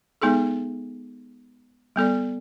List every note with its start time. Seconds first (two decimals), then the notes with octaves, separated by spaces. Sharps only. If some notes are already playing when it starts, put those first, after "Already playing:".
0.22 G#3 B3 D#4 G#4 A4
1.96 G3 B3 A4 D5